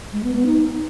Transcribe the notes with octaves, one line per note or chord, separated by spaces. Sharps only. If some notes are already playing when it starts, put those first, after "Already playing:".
G#3
B3
B3
D#4